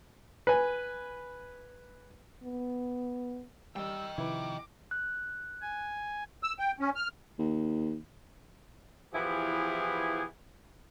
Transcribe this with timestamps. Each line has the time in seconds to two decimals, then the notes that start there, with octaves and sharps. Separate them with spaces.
0.47 B4 G#5
2.43 B3
3.76 G3 D#5 G5 E6
4.18 C3 D#3 F3 E4 B4 D6
4.91 F#6
5.62 G#5
6.43 E6
6.59 G5
6.80 C#4
6.96 F6
7.39 D#2
9.14 E3 F3 B3 E4 G4 G#4